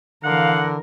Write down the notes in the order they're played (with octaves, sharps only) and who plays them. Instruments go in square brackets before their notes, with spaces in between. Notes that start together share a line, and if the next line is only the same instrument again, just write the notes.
[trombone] D3 [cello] E3 A#4 [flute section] F5 [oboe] F#5